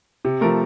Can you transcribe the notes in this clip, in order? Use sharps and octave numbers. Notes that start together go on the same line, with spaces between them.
C3
F3 A3 A#4